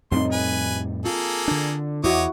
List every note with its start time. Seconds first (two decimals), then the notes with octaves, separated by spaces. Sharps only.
0.12 F2 A2 G3 C4 D#4 C6
0.32 B4 G#5
1.05 A#3 F4 G#4 A4
1.48 D3 D4
2.04 E2 E4 F#4 C#5 D#5 D6